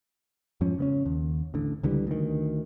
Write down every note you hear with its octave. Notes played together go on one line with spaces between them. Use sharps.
F2 G#2 F3 C#4
C#3 B3 C#4
D#2
A1 D3
C#2 D3 E3 G3
D2 D#3